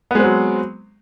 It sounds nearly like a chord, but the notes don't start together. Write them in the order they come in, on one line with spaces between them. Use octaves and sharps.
B3 G#3 C4 F#3